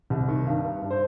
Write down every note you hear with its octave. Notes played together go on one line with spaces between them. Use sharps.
C2
D#3
G2
G2
G2
C5